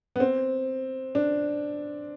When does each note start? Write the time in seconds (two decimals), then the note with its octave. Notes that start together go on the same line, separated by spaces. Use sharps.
0.16 B3
0.20 C4
1.15 D4